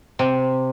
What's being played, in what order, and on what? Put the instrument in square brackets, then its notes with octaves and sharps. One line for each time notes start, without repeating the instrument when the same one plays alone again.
[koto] C3